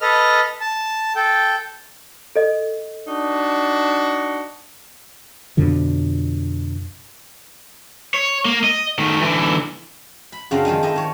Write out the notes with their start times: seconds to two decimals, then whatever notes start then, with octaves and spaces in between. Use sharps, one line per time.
0.01 A4 B4 D#5 F6
0.60 A5
1.16 A4 G5
2.36 A4 D#5
3.08 D4 D#4 F#4
5.57 F2 B2 D3 F3
8.14 C#5
8.45 A#3
8.64 D#5
8.99 D#3 A3
9.21 D3 E3
10.32 B5
10.51 F#2 C#3 C4 D4 F4 A#5
10.65 D#3 F3 G#3 D#4
10.83 D#4 E4 G4 A4 D#5
10.96 D#3 C#5